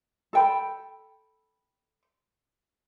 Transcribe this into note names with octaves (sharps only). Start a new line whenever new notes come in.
A4 G5 B5